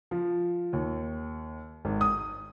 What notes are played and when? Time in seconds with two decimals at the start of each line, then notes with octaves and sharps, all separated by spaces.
0.11 F3
0.73 D#2
1.85 G#1
2.01 D#6